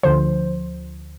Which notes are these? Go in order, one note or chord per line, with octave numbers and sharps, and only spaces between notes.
D2 D3 F3 C5